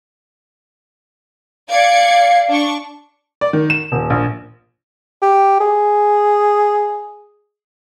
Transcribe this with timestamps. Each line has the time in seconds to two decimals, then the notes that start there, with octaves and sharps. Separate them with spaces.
1.70 D5 F5 G#6 C#7
2.49 D4 C#6
3.41 D5
3.53 D#3
3.70 E7
3.92 D#1
4.10 A#1
5.22 G4
5.61 G#4